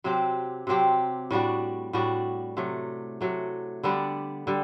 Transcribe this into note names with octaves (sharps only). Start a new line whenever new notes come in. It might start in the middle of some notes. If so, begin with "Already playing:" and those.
C3 F#3 C4 G4
C3 F#3 C4 G4
A2 G3 D4 F#4
A2 G3 D4 F#4
C3 F#3 A3
C3 F#3 A3
D3 G3 B3 D4
D3 G3